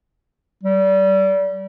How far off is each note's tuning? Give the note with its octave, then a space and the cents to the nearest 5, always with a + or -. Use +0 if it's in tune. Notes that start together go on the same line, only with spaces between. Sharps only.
G3 -25